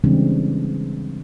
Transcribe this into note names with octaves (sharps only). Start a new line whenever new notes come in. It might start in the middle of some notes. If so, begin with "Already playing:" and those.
C#3 E3 G3 G#3 C4 D4